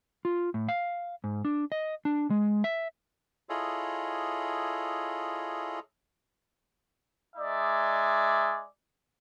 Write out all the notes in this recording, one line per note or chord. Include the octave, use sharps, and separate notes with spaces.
F4
A2
F5
G#2
D4
D#5
D4
G#3
E5
E4 F4 G#4 A4 C#5 D#5
G#3 D#4 D5 E5